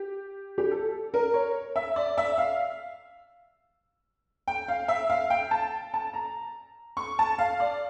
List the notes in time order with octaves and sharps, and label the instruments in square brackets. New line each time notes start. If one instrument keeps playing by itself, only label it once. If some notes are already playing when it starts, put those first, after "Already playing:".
Already playing: [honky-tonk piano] G4
G4
A4
A#4
C#5
E5
D5
E5
F5
G5
F5
E5
F5
G5
A5
A5
A#5
C#6
A5
F5
D5